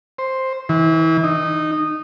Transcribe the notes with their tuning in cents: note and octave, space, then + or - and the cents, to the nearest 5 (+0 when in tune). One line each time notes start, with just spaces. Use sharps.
C5 +5
E3 -30
D#4 -15